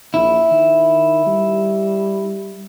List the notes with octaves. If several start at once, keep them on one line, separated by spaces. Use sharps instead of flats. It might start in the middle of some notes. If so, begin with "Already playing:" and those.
A#1 E4
D#3
G3